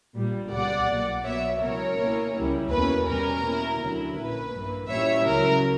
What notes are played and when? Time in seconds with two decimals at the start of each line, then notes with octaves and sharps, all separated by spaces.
0.16 A#1 A#2 G3
0.52 C#2 B2 G3 D5 F#5
0.88 B1 A#2 A#3
1.25 B1 B2 F#3 B3 C#5 E5
1.62 C#2 B2 F#3 C#4 E4 A#4 C#5
1.99 B2 A#3 C#4 E4
2.35 C#2 C#3 G3 C#4 E4
2.71 E2 B2 A#3 C#4 B4
3.08 B2 G3 C#4 A#4
3.44 B2 A#3 C#4 E4
3.80 D2 D3 F#3 C#4 E4
4.17 A#1 A#2 A#3 C#4 B4
4.54 G2 E3 A#3
4.90 A#2 G3 C#4 E4 C#5 E5
5.27 C#2 C#3 F#3 A#4